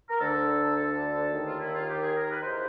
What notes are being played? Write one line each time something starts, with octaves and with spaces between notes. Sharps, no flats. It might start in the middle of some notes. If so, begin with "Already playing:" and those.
A#4
D2 D3 A4
A4
D#2 D#3
F4
E4
F4
G4
G#4
A#4
B4
C#3 E3 C5